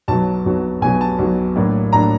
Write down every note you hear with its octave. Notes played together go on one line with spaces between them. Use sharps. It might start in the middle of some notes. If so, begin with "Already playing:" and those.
B1 B2 F#3 A5
B1 B2 F#3
B1 B2 F#3 G#5
A5
B1 B2 F#3
A2 F#3 A#3 D4
A2 F#3 A#3 D4 A#5